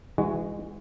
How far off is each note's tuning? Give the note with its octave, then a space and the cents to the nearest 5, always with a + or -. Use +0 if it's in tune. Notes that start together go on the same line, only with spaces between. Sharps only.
E3 +15 G#3 -25 F#4 +0